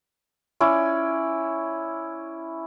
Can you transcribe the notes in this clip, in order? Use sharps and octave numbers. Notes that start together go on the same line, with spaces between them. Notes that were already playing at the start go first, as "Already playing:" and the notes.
C#4 E4 D5